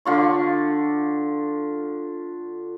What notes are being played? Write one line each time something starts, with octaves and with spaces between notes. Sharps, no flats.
D3 F4 C#6